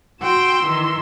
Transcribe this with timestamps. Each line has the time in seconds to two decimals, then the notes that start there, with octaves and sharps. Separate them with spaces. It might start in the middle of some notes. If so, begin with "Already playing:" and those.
0.21 F#4 G5 C6 E6
0.64 D#3 E3